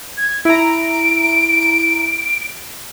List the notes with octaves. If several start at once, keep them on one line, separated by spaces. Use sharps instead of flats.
G#6
E4 A#5 D7